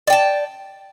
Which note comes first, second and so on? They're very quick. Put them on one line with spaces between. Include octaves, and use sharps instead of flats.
D5 G5 A5